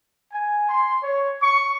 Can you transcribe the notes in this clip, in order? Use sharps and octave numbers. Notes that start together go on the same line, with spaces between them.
G#5
C6
C#5
C#6